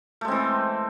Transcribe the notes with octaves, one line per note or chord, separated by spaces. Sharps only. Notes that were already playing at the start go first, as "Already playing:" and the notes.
E3 G#3 A3 C4